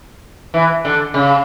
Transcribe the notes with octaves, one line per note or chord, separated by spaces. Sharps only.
E3
D3
C#3